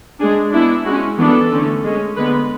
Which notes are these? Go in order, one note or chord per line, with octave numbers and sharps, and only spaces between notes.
G#3 D4 G#4
G#3 B3 D4 E4
G#3 C#4 F#4
E3 B3 D4 A4
D3 A3 C#4
G#3 C#4
D3 G#3 B3 B4